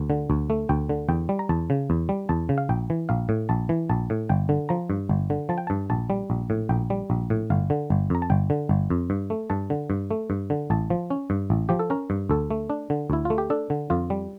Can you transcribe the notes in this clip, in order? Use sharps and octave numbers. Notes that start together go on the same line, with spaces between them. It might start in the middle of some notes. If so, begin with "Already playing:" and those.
Already playing: D2
D3
D2
A3
D2 G5
D3
E2 G5
G3
A#5
E2 A5
C#3
E2
G3
E2 A5
C#3
F5
A#1 G5
E3
A#1 F5
A2
A#1 A5
E3
A#1 A5
A2
G1 G5
D3
F3 A#5
G2
G1
D3
F3 A5
G5
G2 A5
A#1 A5
G3
A#1
A2
A#1 G5
G3
A#1
A2
G1 F5
D3
G1
F2 A#5
A5
G1 G5
D3
G1
F2
G2
A3
G2 A5
D3
G2
A3
G2
D3
A1 A5
F3
C#4
G2
A1
F3 G4
A4
C#4 A#4
G2
D2 A4
A3
D4
D3
D2 E4
A3 F4
G4
D4 A4
D3
F2 F4
G3